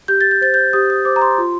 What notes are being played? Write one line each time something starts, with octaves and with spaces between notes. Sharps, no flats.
G4 G6
A6
G6
C5 A6
G6
G4 D#6
D#6
C5 D6
A#5
C6
F4